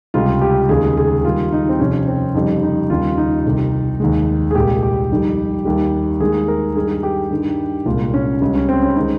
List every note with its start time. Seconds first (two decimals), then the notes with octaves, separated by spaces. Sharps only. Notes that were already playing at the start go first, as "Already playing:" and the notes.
0.14 C#2 C3 G3 F4
0.41 G4
0.69 D#2 C#3 G#3 G#4
0.97 G#4
1.24 D#2 D#3 G3 F4
1.52 D#4
1.69 C4
1.80 F2 C3 F3 C#4
2.08 C4
2.35 F2 C#3 G3 D#4
2.63 D#4
2.90 D#2 C#3 G3 F4
3.18 D#4
3.46 C2 C3 D#3
4.00 D#2 D#3 G#3
4.51 G#4
4.55 C2 A#2 G#3 G4
4.83 G4
5.10 F2 D#3 G3
5.65 D#2 D#3 G3
6.20 D#2 D#3 G#3 G#4
6.48 A#4
6.76 G2 D#3 G3 G#4
7.03 G4
7.31 G2 D#3 G3
7.86 C2 A#2 G#3 F4
8.14 C#4
8.41 C#2 C#3 G3
8.55 C#4
8.69 C4
8.83 C#4
8.96 D#3 G#3 D#4